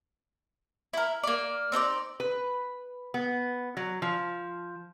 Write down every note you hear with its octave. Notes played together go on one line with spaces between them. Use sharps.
E4 A#4
A#3 D5
C4 D#4 A#4 D5
B4
B3
F#3
F3